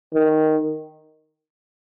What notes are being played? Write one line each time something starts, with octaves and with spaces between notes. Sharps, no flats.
D#3